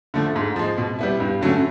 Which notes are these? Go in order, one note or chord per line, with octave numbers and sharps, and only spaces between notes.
D3 F3 A3
G#2
F3 G#3
B2
G3 B3 E4
G2
D3 F#3 A3 C#4